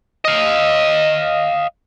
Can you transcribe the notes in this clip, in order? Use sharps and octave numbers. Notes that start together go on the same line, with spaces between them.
D#5 F5